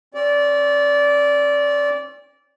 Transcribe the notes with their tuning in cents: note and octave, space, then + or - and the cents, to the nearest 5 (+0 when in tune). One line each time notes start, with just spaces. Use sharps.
C#4 -45 D5 -20